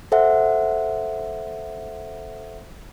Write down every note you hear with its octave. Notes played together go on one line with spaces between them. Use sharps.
A4 C5 E5 F#5